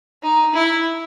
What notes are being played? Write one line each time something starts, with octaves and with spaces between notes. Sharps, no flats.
D#4
E4